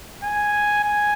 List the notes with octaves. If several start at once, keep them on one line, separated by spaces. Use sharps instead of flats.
G#5
G#5